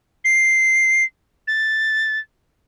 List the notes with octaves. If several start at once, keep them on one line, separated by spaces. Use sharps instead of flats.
C7
A6